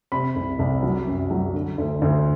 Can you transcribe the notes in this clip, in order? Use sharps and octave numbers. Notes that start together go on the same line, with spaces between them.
C3 B5
C2
C2
F#3
F#2
F#3
D3
D2
D2